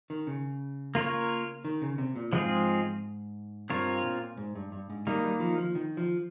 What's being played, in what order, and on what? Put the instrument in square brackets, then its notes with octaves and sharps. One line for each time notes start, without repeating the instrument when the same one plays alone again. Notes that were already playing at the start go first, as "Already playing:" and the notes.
[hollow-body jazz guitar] D#3
C#3
[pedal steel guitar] A#3 F4 A#4 C#5
[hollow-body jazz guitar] D#3
C#3
C3
A#2
[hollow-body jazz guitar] G#2 [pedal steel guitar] F3 G#3 C4 F4 G#4
[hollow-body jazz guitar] G2 [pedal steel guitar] C4 F4 A#4 C#5
[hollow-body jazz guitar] A#2
G#2
G2
G2
G#2
[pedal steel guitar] D#3 A#3 D#4 [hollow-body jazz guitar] G3
[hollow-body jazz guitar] G3
F3
F3
D#3
F3